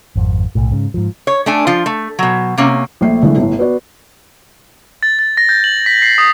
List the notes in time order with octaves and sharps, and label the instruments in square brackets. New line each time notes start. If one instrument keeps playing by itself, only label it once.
[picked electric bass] G#1 F2
B1 A2
G#2 C#3
G#2 F3
[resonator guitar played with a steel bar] C#5
A3 D4 G#5
F3 F4
A3
B2 F#3
C3 A#3 C#4
[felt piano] A#1 A3 C7
D3 E3 G#3 A3
G1 A2
B3 F#4 D5
[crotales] A6
A6
A#6
G6
F#7
B6
C7
D#6